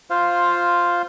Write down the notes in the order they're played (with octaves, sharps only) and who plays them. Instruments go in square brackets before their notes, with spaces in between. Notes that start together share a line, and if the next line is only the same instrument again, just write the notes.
[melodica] F4 C5 F5